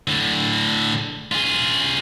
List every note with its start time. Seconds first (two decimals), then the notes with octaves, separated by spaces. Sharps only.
0.08 A2 D3
1.32 F4 G#4